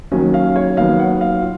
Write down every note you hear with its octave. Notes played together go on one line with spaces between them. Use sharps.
D#2 D#3 F#3 C#4
F5
C#5
D#2 D#3 F#3 B3 F5
F#5
F5
F4